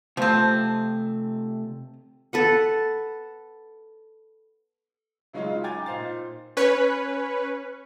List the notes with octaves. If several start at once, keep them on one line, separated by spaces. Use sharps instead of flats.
C3 F3 A3 C4 A5
A4 B4 F#5
C#3 F#3 G#3 C#4 D#4 F4
G5 G#5 A#5 D6 G#6 A6
A#2 D#4 C5 F5 A6
C#4 B4 C#5